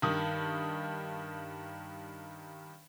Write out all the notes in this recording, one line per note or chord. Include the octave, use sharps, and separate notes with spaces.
G2 D#3 D#6